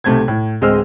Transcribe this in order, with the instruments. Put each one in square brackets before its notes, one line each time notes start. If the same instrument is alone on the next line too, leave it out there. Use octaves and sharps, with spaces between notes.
[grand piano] B1 C3 A3 C5 G#6
A2
D1 G#3 C4 D#5 E6 F6